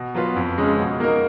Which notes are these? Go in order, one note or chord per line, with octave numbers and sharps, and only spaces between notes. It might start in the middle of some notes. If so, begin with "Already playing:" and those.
Already playing: B2
F#3 B3 F4 B4
F2
C#3 G#3 C#4 G#4
B2
A#3 D#4 A#4